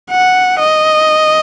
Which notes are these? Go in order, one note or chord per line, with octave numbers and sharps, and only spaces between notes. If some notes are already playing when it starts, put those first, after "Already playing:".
F#5
D#5